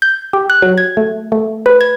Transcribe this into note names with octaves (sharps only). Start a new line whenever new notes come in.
G6
G4
F#6
F#3
G#6
A3
A3
B4
G#6